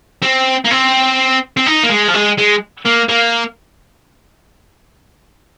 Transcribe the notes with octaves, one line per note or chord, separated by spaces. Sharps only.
C4
A#3
C4
C4
D#4
A#3
G#3
F3
G#3
G#3
A#3
A#3